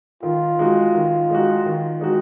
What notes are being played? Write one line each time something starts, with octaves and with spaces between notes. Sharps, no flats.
D#3 F4
G#3 D#4 F#4
D#3
G#3 D#4 F#4
D#3
G#3 D#4 F#4